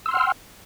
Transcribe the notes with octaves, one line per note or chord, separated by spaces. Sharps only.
F#5 G5 C6 E6 F6